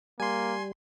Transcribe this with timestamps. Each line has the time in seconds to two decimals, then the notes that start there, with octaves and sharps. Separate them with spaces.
0.20 G3 A#3 G#5 C6